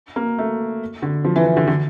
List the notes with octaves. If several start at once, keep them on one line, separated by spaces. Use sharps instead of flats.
A#3
A3
D3
F3
E3
E3
D3
D3